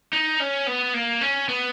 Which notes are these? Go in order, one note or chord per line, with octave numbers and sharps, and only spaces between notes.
D#4
C#4
B3
A#3
C#4
B3